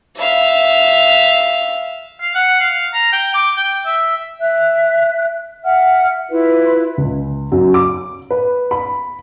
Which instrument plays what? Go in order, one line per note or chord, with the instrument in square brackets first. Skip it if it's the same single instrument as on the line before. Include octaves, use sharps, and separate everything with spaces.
[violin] E5 F5
[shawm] F5
F#5
F5
A#5
G5
D6
G5
E5
[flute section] E5 F#6
E5 F#5 F6
E4 F4 B4
[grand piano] C#2
F#2
D6
B4
B5